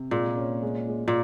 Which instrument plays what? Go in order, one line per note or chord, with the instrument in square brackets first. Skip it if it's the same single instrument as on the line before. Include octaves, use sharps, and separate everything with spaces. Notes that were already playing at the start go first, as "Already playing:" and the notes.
Already playing: [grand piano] C3
[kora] A#2 [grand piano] G#3
[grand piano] C#4
G#3
G#3
[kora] A#2